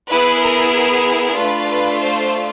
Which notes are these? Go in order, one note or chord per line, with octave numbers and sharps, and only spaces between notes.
B3 E4 G#4 B4
A#4
A#4
A3 D4 F4 B4
B4
C5